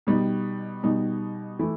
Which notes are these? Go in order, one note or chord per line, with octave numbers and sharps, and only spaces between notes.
B2 G3 D#4
B2 G3 D#4
E3 A3 E4